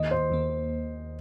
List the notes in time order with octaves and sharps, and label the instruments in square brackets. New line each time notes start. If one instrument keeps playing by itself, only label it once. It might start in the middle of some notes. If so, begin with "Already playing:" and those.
Already playing: [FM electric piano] D#2 D#3 A#3 [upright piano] D#5
[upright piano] C5
[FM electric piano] D#2 D#3 A#3